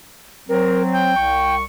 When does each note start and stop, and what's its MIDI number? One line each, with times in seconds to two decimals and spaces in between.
0.49 1.12 54
0.49 1.12 60
0.49 0.83 70
0.93 1.56 79
1.16 1.63 36
1.16 1.63 85